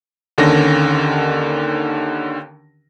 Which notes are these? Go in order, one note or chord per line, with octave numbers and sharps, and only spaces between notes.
D#2 D3 D#3 C#4 A#6